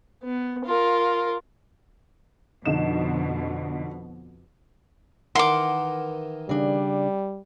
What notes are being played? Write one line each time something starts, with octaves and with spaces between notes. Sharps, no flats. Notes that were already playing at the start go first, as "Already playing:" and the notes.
B3
F4 A#4
F2 B2 D3 D#4 E7
D#3 E3 A#4 F#5 C6 D6
C#3 G3 D4